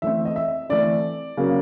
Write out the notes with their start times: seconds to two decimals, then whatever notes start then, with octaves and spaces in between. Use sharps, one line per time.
0.02 E3 A3 C4 E5
0.25 D#5
0.36 E5
0.69 E3 A3 C4 D5
1.37 C#3 F#3 A#3